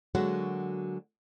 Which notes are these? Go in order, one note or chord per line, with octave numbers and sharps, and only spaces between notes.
D3 F#3 G#3 A#3 F#4 F#5